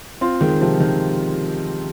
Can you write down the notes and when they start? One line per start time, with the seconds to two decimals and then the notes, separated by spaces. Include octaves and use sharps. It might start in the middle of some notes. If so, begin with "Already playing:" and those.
0.21 C4 F4
0.41 D#3 G#3
0.61 C3 F3
0.80 D#3